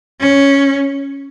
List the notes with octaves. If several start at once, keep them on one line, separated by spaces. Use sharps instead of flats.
C#4